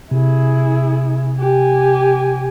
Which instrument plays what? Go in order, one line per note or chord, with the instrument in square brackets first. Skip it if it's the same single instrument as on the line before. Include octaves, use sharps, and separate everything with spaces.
[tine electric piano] C3 [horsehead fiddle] E4 G#4
[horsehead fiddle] G4 G#5